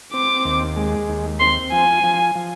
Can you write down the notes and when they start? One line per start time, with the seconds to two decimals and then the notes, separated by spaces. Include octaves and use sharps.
0.13 C4 D6
0.45 D#2
0.76 G#3
1.09 D#2
1.40 C4 C6
1.72 F3 G#5
2.03 F3
2.35 F3